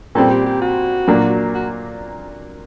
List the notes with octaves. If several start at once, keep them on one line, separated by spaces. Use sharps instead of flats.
A#2 G3 C4 A4
G4
G4
F#4
A#2 F#3 A#3 D4
F#4